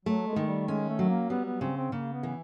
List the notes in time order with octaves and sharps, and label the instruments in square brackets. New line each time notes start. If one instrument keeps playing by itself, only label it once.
[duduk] F#3 [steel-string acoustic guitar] A3
[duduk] G#3
[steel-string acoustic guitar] D#3
[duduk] G3
[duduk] G#3 [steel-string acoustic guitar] C#4
[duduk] A3
[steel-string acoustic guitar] F#3
[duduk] A#3
[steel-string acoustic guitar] G3 [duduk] B3
[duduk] B3
[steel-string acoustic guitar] C#3 [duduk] C4
[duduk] C4
[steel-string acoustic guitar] C#3 [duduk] A#3
[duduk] B3
[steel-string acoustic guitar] E3